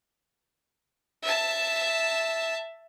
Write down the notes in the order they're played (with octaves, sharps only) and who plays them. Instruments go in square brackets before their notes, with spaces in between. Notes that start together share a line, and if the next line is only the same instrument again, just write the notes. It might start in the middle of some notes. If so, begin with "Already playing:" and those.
[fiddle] E5 A5